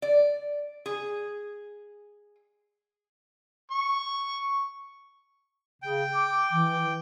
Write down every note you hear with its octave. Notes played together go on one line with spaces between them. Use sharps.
D5
G#4
C#6
C#3 G5
D6
E3